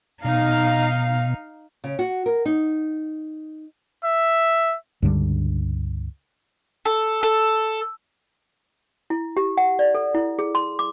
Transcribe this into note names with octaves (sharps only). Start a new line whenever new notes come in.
B2 D#4 F5
C#3
F#4
A#4
D#4
E5
C#2 G2 D3 G3
A4
A4
E4
G4
F#5
D5
A4
E4
G#4
C6
D6